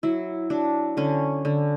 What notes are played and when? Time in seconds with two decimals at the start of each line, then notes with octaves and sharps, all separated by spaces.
0.03 F#3 E4
0.50 F#3 D4
0.97 D3 C#4
1.45 D3